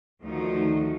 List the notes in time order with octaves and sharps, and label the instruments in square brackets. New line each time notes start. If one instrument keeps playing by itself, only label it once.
[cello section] D2 D#3 F3 A3 D#4 F#4